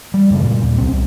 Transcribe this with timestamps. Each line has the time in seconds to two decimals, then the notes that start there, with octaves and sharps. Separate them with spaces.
0.14 G3
0.30 F#2 C#3 G#3
0.43 A#2
0.62 D#2
0.78 C2 C4
0.92 C2